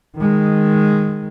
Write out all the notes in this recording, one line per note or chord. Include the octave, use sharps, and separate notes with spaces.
D#3 G#3